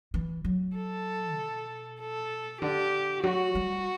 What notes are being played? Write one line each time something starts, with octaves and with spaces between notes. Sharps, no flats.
E3
F#3
A4
B2
A4
D3 G4
F#3 F#4
G3